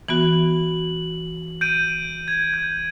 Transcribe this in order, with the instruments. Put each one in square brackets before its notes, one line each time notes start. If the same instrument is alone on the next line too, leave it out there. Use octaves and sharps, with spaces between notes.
[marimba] E3 B3 F#4 [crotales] F#7
[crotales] G6 D7 D#7
G#6
G6